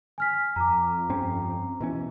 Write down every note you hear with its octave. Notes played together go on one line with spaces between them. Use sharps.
G#5 F6 B6
F2 A#5 D6
G2 C4 C#4
B2 E3 C#4